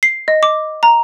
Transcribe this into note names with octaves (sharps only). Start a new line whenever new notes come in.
C7
D#5
D6
A#5